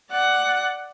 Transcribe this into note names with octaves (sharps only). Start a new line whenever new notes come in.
D5 F#5